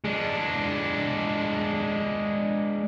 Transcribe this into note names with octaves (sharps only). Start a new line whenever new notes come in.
G#3 D4